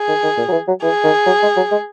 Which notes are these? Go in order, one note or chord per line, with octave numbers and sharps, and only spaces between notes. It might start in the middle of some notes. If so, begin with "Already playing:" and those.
Already playing: G#4
D#3
D#3
A#2
F#3
E3
F#3
E3 G#4
D#3
F#3
G#3
F#3
G#3